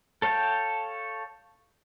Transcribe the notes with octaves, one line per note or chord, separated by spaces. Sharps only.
A4 C#5 F5 G5 A5